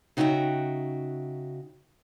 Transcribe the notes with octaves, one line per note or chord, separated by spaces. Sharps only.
C#3 D#4 F#4 B4 E5 G5